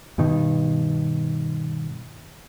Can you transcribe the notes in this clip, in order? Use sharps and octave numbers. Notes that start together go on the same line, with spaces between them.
G2 B2 D#3